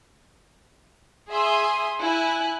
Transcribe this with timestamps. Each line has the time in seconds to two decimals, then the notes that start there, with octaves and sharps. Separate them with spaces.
1.30 G#4 E5 C6 D#6
2.01 E4 G#5 F#6